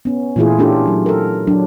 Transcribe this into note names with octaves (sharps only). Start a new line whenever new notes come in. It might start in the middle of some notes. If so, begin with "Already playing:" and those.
B3 C#4
A#2 E3 A3 E4 F4 G#4
A3 C#4 D4 F4 G4 A4
F#3
A4 A#4
F#3 D4